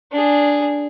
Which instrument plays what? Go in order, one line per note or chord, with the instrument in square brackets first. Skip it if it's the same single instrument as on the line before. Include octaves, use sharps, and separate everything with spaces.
[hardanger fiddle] D4 G#4